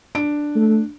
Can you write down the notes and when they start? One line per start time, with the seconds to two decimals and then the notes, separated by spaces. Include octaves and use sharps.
0.15 D4 D7
0.55 A3